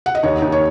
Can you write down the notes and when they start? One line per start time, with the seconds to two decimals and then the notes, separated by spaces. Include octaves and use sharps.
0.06 F#5
0.15 D#5
0.23 D#2 C#5
0.42 D#2
0.52 C#5